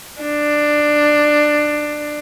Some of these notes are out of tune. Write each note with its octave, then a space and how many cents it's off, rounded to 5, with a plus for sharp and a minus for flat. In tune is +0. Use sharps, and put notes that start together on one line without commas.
D4 +15